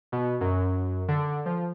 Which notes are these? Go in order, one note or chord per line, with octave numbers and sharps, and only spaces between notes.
B2
F#2
D3
F3